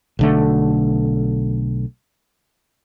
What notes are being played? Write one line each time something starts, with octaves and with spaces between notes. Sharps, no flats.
B1 D3 A3